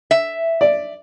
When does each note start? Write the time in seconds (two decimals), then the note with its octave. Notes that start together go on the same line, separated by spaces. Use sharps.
0.11 E5
0.61 D5